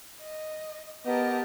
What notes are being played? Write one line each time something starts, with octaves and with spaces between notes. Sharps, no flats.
D#5
B3 G4 A#4 D#5 A5